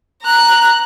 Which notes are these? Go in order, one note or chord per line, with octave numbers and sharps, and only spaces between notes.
A#5 F#6